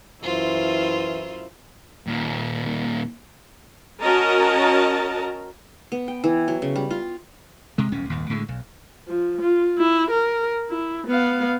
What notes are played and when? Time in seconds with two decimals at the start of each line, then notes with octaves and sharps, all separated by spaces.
0.23 F#2 E3 E4 F4 C5
2.07 D#2 A#2
4.02 C#4 F#4 A#4 D#5 A5 A#5
5.92 B3
6.08 G5
6.24 E3
6.48 F#3
6.62 C#3
6.76 G3
6.91 F4
7.78 C3 G#3
7.92 D#1 B1 C#4
8.10 D#1 G#1 D#2
8.30 A2 D3 D#3 G#3
8.48 B1
9.07 F3
9.41 F4
9.78 E4
10.11 A#4
10.70 E4
11.07 B3 F5